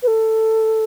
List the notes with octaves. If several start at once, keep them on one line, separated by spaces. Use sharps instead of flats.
B4
A4